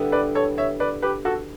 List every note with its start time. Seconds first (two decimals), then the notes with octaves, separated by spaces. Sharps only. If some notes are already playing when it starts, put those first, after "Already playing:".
Already playing: D3 G3 B3 E4
0.12 B4 D5
0.35 A4 C#5
0.58 C#5 E5
0.80 B4 D5
1.02 G4 B4
1.25 F#4 A4